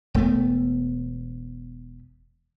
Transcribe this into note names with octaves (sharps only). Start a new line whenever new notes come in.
E1 A3 B3